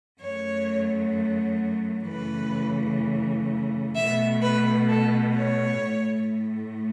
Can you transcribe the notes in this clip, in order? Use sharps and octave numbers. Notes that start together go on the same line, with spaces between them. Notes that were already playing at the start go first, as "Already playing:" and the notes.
F#2 F#3 A3 C#5
F#2 C#3 E3 A3 B4
B2 A3 E5
B4
A4
C#5
A2 A3